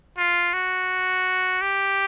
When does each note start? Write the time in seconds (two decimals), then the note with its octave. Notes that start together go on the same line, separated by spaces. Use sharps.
0.18 F4
0.54 F#4
1.61 G4